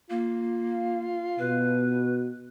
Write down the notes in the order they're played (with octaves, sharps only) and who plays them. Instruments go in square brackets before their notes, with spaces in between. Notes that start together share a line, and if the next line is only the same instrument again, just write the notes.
[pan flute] A#3 [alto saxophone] F4
[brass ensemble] B2 [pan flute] B4